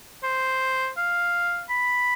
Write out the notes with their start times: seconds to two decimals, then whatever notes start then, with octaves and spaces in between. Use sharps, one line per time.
0.23 C5
0.97 F5
1.70 B5